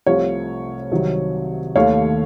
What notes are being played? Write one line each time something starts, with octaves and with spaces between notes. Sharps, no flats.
C2 C3 F3 A3 C#5 F5
C2 C3 D#3 F#3
D#2 D#3 A3 C#5 F5